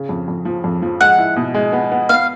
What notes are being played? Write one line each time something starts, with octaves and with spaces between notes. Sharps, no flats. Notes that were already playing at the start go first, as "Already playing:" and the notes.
Already playing: C#3
F2
F2
F3
F2
F3
G#3 F#5
E4
B2
G#3
B3
B3
B3 F5